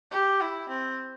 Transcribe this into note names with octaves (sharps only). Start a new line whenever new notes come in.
G4
E4
C4